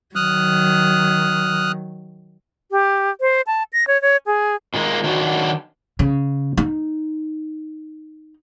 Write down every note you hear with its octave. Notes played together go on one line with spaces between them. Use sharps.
D#3 F#3 D#6 F6 F#6
G4
C5
A5
A#6
C#5
C#5
G#4
A#2 D#3 G#3 A#3
D#3 F#3 D4 F#4
C#3
D#4